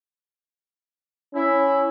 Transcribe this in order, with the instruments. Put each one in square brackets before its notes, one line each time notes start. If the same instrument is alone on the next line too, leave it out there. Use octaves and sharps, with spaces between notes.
[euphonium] C#4 [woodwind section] E4